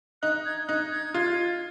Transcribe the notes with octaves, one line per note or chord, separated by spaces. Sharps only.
D#4 F#6
G#6
D#4 F#6
G#6
F4